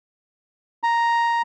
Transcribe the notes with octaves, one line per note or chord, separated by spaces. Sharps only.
A#5